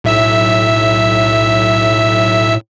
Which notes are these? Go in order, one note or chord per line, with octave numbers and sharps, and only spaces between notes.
B1 A2 E5 E6